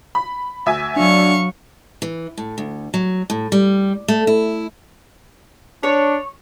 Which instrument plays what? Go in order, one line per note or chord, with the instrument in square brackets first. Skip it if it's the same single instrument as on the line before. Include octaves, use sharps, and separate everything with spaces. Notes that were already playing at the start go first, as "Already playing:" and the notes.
[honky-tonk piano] B5
D2 E5 G#5
[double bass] F#3 [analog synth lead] D4 [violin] F5 C#6
[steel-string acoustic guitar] E3
A2
D2
F#3
A2
G3
A3
E4
[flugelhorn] D4 [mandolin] C#5